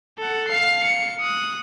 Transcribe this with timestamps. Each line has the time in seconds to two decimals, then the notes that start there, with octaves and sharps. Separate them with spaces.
0.19 A4 F#5
0.48 F5 C7
0.84 C#7
1.22 D#6 F#6